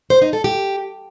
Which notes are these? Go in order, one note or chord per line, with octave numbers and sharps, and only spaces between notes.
C5
D#4
A4
G4